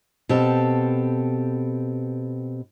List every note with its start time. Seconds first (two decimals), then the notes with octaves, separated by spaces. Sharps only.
0.29 B2 C4 G4 A4